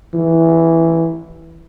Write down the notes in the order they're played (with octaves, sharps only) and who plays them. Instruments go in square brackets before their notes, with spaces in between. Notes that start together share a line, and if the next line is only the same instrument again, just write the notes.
[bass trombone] E3